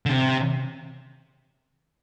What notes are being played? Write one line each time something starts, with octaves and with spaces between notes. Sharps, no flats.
D3
C3